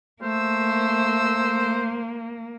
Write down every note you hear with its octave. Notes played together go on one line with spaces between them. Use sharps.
A3 A#3 C5 E6